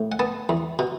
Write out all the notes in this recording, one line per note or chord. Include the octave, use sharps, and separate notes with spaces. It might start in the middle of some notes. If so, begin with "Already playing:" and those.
Already playing: A2
F#5
B3 A5
E2
B2